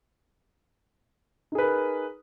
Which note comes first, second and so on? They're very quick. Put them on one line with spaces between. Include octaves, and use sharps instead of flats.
D#4 G#4 B4 A#4